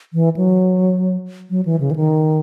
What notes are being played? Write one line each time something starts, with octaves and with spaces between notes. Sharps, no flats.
E3
F#3
F#3
E3
C#3
E3
D#3